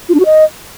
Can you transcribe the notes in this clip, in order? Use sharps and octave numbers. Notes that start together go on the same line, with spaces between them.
F4
D4
F#4
D#5